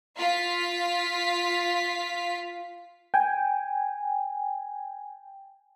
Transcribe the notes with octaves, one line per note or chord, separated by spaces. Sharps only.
F4 F5 B6
G5 G#5